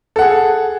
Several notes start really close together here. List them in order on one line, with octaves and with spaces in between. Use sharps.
A4 F#5 G#4